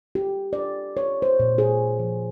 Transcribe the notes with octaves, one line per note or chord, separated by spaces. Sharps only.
G4
D5
C#5
C5
A#2
G#4
F3